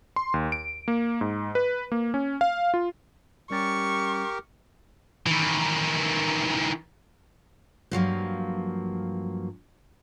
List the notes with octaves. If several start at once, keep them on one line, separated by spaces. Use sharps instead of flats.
C6
D#2
D7
A#3
G#2
B4
A#3
C#4
F5
F4
G3 C#4 G4 A#4 C#6 A6
D#3 E3
G2 F3 F#3 A#3